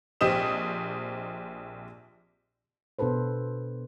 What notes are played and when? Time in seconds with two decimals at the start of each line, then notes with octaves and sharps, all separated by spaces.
0.21 A#1 C4 G4 D#5 D#6 E7
2.99 B2 D4 A4 B4 C5